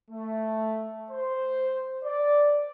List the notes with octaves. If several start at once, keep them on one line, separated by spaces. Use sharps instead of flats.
A3
C5
D5